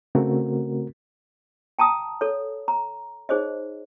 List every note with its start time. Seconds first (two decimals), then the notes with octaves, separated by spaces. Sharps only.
0.15 C#3 A3 C4 C#4 F#4 A#4
1.79 G5 A5 A#5 D#6
2.21 A4 C#5
2.68 A#5
3.29 D#4 G#4 C5 C#5 D#5